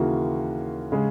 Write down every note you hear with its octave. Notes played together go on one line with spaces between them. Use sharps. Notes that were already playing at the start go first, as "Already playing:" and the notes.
Already playing: D#2 C#3 E3 A#3 F#4
C#3 G#3